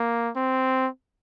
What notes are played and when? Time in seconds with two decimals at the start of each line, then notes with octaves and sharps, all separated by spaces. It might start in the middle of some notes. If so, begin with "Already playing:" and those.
Already playing: A#3
0.36 C4